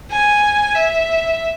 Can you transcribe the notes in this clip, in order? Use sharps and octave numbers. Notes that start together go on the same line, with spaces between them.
G#5
E5